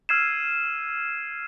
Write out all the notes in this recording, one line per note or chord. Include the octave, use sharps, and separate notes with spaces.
E6 F6 G#6 C7 D#7 E7